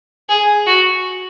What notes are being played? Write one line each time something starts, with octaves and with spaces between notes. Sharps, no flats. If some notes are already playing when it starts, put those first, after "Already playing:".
G#4
F#4